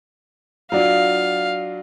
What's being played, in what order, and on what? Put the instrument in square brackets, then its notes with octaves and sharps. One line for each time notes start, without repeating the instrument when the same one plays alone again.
[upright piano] F#3 D4 F4 [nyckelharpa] F5